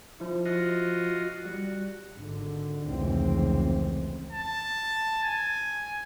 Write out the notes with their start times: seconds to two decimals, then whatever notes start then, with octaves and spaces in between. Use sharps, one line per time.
0.20 F3 E4
0.45 F4 F#4 D#5
1.45 G3 F#4
2.13 G#1 D3
2.84 F1 C#2 E3 C4
4.32 A5
5.23 G#5